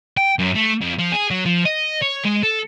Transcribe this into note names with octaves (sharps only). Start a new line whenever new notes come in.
G5
F#2
A3
F2
F3
G#4
F#3
F3
D#5
C#5
G#3
A4